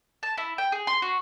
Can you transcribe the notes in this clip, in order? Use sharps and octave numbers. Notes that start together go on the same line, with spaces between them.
A5
E4
G5
G#4
C6
F#4